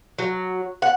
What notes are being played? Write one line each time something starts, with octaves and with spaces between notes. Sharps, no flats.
F#3
F#5